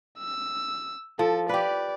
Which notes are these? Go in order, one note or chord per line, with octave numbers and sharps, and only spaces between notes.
E6
F3 A4
G4 B4 D5